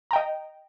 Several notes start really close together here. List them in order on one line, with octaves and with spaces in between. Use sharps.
A#5 G5 D#5